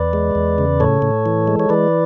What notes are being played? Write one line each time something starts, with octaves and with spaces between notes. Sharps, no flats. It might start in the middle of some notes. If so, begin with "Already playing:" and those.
Already playing: E2 B4 D5
G#3
E2
C#3
A2 A4 C#5
A2
E3
G#3
C#5
E3 B4 D5